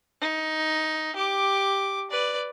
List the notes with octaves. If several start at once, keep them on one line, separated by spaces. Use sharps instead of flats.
D#4
G4 D6
B4 D5